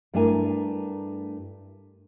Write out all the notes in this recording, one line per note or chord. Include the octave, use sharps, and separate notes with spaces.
G2 A3 D4 E4 A#4 G#5